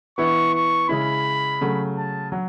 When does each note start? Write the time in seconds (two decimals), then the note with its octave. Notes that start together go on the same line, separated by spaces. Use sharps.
0.18 E3 B3 E4 C#6
0.54 C#6
0.89 C#3 G#3 C#4 E4 B5
1.61 C#3 F#3 A3
1.97 A5
2.32 F#3